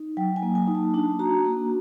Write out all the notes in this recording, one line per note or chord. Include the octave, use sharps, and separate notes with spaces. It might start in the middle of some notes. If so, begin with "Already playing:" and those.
Already playing: D#4
F#3 G5
G#5
A#3
G#5
D#4
A5
D4 A5
F#4 A#5
A#3 A#5